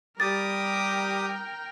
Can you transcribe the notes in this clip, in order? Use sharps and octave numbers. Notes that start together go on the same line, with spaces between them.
G3 G4 A#4 G5 D6 D#6 A6